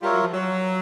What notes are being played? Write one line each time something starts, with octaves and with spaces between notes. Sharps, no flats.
G3 F4 A#4 C#5 E5
F#3
F3
F#3